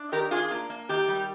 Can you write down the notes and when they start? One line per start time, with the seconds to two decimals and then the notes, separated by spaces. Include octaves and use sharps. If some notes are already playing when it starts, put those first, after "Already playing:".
Already playing: D4
0.12 D#3 G4 A#4
0.31 D4 F4 G#4
0.51 A#3
0.70 A#3
0.89 D#3 G4
1.08 G3